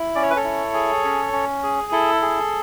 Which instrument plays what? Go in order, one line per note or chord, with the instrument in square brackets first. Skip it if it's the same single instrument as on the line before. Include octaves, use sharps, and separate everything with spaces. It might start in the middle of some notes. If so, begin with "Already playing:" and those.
Already playing: [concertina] E4
C#4 D5
C#5
B4
A4 C#5
E4
G#4
C#4
C#4
G#4
E4 A4
G#4